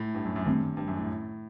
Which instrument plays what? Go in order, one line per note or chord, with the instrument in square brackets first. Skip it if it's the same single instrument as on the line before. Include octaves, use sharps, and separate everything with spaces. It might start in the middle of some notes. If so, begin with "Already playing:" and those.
Already playing: [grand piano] A2
G2
F#2
F#2
[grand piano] G2 [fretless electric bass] D#3 A3 C4
[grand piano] G2
F#2
A2